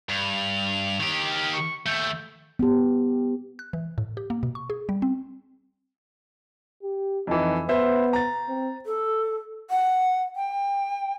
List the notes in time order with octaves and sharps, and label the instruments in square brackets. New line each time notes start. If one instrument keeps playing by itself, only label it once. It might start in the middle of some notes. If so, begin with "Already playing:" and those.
[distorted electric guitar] G2 [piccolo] F7
[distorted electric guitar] D#3 G4
[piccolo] F6
C#6
[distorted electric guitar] D#2 A3 [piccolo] G6
[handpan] B3 G4
[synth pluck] F#6
E3
A2
G4
A#3
B2
C#6
G#4
G3
C4
[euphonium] G4
[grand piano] F2 E3 [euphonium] D#4
[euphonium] B3 [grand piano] B4 C5 E5
[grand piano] A#5 A6
[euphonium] C4
[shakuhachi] A4
F#5
G5